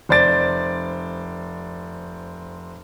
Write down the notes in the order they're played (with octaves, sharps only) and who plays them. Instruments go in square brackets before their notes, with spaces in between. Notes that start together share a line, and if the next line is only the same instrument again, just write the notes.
[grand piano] F1 C5 D5 A6 D7